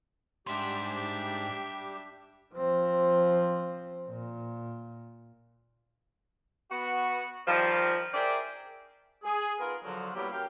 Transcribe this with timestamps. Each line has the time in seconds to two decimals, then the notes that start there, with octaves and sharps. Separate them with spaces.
0.47 G#2 G3 D4 G4 E5 C6
2.54 F3 C4
4.09 A#2
6.71 B3 F#4
7.48 D#3 F3 G3
8.13 G#4 A#4 C5 D5 E5 G5
9.24 G#4
9.59 B3 D#4 F4 G#4 A#4
9.84 D3 F3 F#3
10.14 F#3 G3 A#3 B3 E4 G4
10.31 F#2 G4 A#4 F5 G5